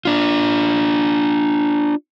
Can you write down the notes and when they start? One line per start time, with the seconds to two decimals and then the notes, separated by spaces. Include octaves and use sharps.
0.05 D4 F4